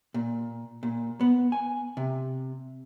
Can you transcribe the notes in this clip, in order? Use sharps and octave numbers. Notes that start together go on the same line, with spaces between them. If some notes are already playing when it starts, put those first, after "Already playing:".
A#2
A#2
B3
G#5
C3